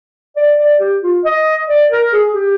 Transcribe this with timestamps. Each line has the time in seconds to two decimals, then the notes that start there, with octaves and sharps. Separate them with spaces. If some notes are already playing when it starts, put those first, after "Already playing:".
0.36 D5
0.59 D5
0.80 G4
1.03 F4
1.25 D#5
1.68 D5
1.91 A#4
2.13 G#4
2.34 G4